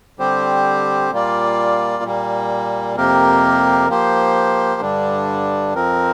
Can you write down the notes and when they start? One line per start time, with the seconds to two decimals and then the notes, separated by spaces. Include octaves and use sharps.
0.19 D3 G3 C4 G4 C5
1.11 A#2 G3 A#3 F4 D5
2.03 A#2 G3 A#3
2.96 F2 C3 A#3 G4 A#4
3.89 F3 A#3 G4 C5
4.81 G2 D3 G3 D4
5.74 F2 F3 C4 A#4